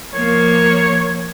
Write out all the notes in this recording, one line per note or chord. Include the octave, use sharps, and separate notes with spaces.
F3 A#3 C#5